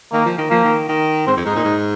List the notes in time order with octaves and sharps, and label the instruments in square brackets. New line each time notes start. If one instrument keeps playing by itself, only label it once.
[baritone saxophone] D#3 [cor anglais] A#3
[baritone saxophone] F3
D#3
[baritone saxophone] F3 [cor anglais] A#3
[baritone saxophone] D#3
D#3
[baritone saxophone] G#2 [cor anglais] C4
[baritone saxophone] F2
[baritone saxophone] G#2 [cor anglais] D#4
[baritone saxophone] A#2
G#2